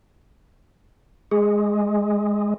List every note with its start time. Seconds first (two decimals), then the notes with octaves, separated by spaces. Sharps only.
1.31 G#3 G#4